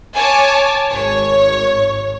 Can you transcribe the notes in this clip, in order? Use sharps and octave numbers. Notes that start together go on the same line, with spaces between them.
C#5 G#5 A5 D6
G#1 C#5